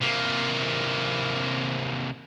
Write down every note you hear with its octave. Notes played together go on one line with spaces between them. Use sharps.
C3 A#3